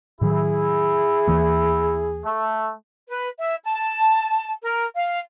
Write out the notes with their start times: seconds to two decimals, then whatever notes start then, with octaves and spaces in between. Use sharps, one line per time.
0.21 A2 D#3 F#3 E4 G#4
1.27 D#2 E3 A#3
2.24 A3
3.08 B4
3.40 E5
3.64 A5
4.63 A#4
4.95 F5